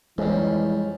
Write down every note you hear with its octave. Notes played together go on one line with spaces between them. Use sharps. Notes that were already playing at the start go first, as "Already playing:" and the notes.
F2 C#3 E3 G3 G#3